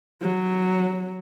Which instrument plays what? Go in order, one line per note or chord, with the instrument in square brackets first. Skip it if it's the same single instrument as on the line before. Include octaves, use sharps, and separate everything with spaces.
[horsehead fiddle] F#3